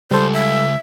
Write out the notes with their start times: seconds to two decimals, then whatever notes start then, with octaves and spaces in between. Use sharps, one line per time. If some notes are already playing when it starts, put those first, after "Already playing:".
0.11 C#2 G3 A4 C5
0.33 E5